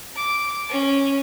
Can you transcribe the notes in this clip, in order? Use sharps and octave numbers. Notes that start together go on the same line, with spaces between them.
D6
C#4